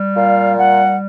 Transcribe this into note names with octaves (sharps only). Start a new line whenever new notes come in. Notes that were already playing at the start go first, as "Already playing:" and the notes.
Already playing: G3
A#2 F5
G3 F#5